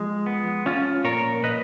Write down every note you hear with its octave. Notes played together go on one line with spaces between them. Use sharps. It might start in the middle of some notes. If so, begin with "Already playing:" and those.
Already playing: F3 G#3
B3
F3 C#4 F4
A#2 A#4 C#5
A#2 B4 D#5